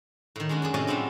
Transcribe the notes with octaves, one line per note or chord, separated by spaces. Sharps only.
A2 D#3
G#3 C#4 D4 F#4
F#2 D4 G#4
A2 C3 C#4 F#4 D5 D#5
F3 G3 G#3 C4 D4